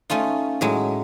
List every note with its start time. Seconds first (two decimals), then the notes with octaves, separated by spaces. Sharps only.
0.10 A3 C#4 D#4 F4
0.61 A2 F#3 G#3